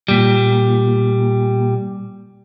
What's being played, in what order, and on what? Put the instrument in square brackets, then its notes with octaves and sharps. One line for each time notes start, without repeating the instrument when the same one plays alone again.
[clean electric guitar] A#2 G3